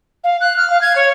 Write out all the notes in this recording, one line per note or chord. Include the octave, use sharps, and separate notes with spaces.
F5
F#6
F6
F5
G#6
C#5